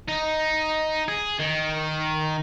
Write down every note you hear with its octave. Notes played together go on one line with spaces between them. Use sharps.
D#4
G#4
D#3